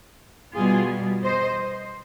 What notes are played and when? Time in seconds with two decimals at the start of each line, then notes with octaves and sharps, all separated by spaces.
0.55 B2 G3 F4 G#4
1.24 C5 D#5